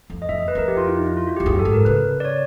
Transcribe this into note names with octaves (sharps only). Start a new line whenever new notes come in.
F2
D#5
F2 E5
D#5
B4
F2 A#4
G4
F4
E4
D#4
E4
F4
F#4
F2 G4
F#2 G#4
A4
G#2
A#4
C#3 B4
D5
C#5